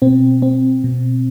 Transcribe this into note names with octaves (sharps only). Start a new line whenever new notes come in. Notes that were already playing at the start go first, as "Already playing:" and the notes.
B2 C4
C4
B2